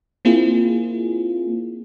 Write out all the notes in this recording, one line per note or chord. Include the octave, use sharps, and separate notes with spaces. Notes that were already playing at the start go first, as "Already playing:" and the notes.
A#3 C4 E4 F4 G#4